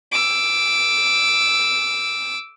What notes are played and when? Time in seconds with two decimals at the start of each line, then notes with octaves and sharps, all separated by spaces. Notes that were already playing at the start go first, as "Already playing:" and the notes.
0.12 D6 E6